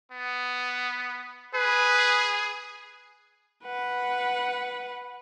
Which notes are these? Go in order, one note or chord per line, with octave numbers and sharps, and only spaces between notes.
B3
G#4 B4
B4 F#5